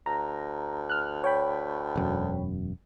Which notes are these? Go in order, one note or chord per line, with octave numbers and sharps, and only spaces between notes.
D2 A#5
F6 F#6
C#5 G5 B5
E1 F#2